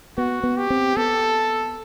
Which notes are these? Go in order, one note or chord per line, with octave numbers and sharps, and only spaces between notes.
B3 F#4
B3
G4
C4
B3 A4